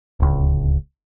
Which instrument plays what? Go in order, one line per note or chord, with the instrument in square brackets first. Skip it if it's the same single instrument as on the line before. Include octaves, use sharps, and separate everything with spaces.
[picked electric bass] D1 C#2